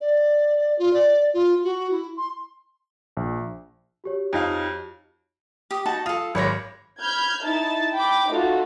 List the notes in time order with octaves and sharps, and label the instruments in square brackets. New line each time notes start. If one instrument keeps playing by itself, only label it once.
[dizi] D5
F4
D5
F4
F#4
E4
C6
[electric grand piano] A#1
[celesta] F#4 G4 C#5
[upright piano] F2 D#4 F5
[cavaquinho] G4 D#6
D#4 F#4 A5
[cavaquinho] F4 A4 [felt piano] D#6
[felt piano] G#1 C#5 A#6 [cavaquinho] B4 D5 C#6
[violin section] B5 F6 G6 G#6
D#4 E4 A5 A6
G5 B5 D6
A3 D#4 F4 F#4 A4